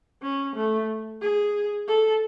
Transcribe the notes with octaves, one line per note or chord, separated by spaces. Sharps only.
C#4
A3
G#4
A4